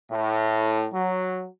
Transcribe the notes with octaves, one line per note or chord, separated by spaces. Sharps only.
A2
F#3